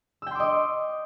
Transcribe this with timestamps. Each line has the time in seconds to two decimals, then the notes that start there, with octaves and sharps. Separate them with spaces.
0.22 E6
0.27 G5
0.31 C6
0.35 D6
0.40 D#5